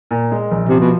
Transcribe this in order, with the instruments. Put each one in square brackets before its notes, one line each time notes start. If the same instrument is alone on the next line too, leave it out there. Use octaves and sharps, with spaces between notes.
[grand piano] A#2
G#3
A#1
[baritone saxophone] C3 [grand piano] F3
[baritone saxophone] B2